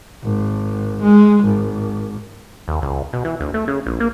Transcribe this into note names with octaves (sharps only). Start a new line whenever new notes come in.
G#1
G#3
G#1
D#2
C#2
B2
E3
D2
A3
C#3
A#1
A#3